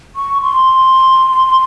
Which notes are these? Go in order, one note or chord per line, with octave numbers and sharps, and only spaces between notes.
C#6
C6